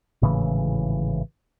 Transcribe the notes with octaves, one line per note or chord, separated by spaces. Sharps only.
G#1 A2 C#3 E3